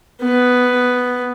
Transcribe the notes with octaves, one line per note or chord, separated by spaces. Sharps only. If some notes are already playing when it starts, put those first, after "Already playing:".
B3